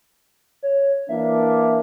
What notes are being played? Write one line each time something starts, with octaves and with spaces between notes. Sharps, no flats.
C#5
E3 A#3 D4 E5
E5